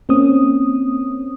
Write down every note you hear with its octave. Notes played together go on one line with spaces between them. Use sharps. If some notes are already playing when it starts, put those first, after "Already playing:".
A#3 C4 C#4 D#6